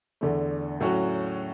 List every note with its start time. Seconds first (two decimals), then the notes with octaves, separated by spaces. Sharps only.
0.21 E2 D3 A3
0.80 A2 F#3 C#4 F#4